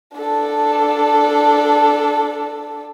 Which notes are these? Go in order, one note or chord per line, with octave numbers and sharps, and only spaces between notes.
D4 A4